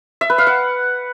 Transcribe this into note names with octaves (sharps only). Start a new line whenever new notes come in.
E5
B4
F5
F#5